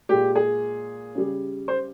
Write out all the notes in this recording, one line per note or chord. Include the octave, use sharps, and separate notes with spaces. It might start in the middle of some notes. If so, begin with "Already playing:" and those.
A#2 G#3 G4
G#4
C#3 G3
C5